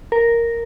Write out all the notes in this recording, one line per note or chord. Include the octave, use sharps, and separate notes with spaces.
A#4